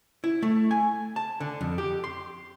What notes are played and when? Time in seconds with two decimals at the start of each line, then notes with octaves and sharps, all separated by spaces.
0.24 E4
0.42 A3
0.71 G#5
1.16 A5
1.40 D3
1.61 F2
1.78 G4
2.04 C6